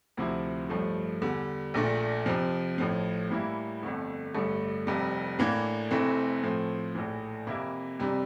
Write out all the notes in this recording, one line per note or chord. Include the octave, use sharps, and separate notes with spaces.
D2 C3 F3 C4 E4
A1 G2 F3 A3
E2 D3 G3
A#1 A#2 A3 D4
F2 C3 F3
A1 A2 F3
A2 E3 G3 A#3 E4
G1 F2 D3 A3
A1 G2 D3 A3
F1 F2 C3 G3
A2 E3 A#3 D4
F1 F2 E3 A3 C4
A2 F3 A3 C4
A#1 A2 E3
F2 C3 E3 A#3 E4
F2 C3 G3 D4